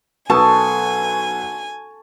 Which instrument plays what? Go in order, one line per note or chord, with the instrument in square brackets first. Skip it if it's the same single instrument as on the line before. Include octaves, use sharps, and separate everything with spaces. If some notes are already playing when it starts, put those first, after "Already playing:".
[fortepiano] B1 D#6 [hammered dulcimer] A4 C#6 [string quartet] G#5 [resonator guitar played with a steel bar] A5